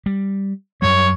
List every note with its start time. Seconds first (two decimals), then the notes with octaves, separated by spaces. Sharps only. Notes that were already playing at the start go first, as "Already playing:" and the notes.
0.06 G3
0.82 F#2 F#3 G3 C#5